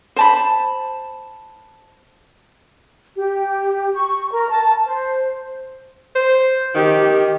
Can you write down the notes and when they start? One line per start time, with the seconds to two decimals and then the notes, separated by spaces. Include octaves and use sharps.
0.16 C5 A5 B5
3.16 G4
3.94 C#6
4.32 A#4
4.50 A5
4.86 C5
6.15 C5
6.75 D#3 G4